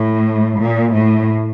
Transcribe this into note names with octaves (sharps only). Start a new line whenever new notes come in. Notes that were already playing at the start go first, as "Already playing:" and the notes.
Already playing: A2
A#2
A2